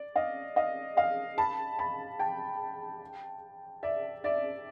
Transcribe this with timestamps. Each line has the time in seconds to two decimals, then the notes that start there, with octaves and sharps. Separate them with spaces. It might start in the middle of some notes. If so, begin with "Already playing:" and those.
Already playing: D5
0.16 D#5 F5
0.56 D#5 F5
0.97 D#5 F5
1.38 A5 B5
1.79 A5 B5
2.20 G5 A5
3.83 D5 E5
4.24 D5 E5